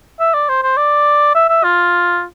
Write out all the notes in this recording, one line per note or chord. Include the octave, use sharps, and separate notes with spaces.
E5
D5
C5
C5
D5
E5
E5
F4